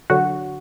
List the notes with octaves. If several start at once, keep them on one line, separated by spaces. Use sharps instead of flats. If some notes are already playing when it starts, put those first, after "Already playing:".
D3 F#3 F#4